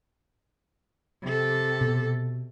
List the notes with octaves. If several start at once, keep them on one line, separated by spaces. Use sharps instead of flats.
C3 A4
B2